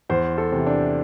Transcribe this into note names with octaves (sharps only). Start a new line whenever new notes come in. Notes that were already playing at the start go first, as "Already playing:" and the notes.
E2 C5
A4
C3 E3
D4